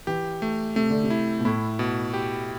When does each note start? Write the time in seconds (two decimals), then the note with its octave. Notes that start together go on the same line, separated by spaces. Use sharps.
0.07 E3 G4
0.42 A3
0.76 C3 A3
0.90 D3
1.03 C3
1.10 E4
1.40 B2
1.45 A2 E4
1.79 B2
2.14 G4